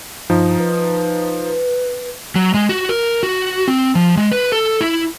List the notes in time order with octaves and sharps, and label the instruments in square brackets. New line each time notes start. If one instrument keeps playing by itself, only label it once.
[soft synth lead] G2 [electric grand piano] F3 D#4
[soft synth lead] B4
[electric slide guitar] F#3
G#3
F#4
A#4
F#4
C4
F3
G#3
B4
A4
E4